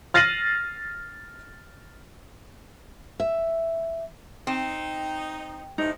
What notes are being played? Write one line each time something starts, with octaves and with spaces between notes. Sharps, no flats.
F6 A6 A#6 C7 D#7 F#7
E5
C4 D#4
A2 C3 D#4